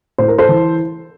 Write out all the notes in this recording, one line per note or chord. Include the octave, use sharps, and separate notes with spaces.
A2 C5
A#4
A4 C5
E3